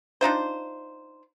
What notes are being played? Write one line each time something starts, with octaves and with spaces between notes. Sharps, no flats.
D4 D#4 F4 C5